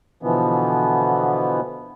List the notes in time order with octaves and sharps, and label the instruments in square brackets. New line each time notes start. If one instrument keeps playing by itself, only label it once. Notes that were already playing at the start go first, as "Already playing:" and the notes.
[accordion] B2 D3 E3 F3 B3